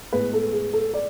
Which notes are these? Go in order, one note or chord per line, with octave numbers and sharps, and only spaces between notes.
A2 G#3 B3 B4
A4
G#4
A4
D5